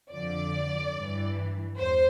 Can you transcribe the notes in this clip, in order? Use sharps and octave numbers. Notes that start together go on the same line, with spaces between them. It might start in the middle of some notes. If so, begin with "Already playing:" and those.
F2 D3 F3 D5
G2 E3
E2 C5